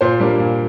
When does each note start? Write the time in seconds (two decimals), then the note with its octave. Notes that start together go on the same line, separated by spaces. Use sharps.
0.01 A#2 C5
0.19 G3 A#3 D4
0.39 A#2